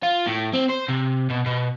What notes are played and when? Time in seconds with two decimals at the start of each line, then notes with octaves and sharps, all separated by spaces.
0.03 F4
0.27 A2
0.54 C4
0.70 C5
0.89 C3
1.30 B2
1.46 B2